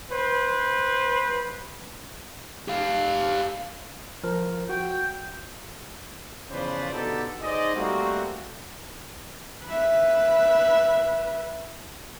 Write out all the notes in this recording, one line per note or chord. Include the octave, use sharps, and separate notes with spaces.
B4 C5
G4 F5
F3 A#4
F#4 G5
E2 C#3 F3 B4 C5 D5
B2 D3 D#4 G4 A4
D#4 G#4 C5 D5 D#5
G3 A3 A#3 C4 F#4
B4 E5